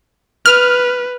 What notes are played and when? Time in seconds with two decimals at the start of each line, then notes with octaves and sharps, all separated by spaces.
0.46 B4 F6